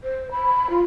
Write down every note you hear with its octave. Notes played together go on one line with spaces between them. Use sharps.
C5
B5
F4